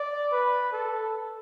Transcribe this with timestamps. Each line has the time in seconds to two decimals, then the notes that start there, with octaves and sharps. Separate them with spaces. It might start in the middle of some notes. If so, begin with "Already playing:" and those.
Already playing: D5
0.32 B4
0.72 A4